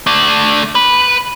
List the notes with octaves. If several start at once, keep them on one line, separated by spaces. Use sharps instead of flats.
A3 D4
B4